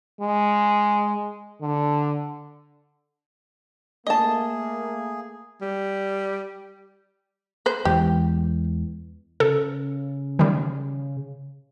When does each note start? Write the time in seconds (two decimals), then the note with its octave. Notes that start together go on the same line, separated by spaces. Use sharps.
0.21 G#3
1.61 D3
4.07 A3 A#3 G#4 D#5 A5
5.61 G3
7.66 B4 C5
7.85 E2 E3 G#3 G4
9.40 C#3 A4
10.39 D#3 G3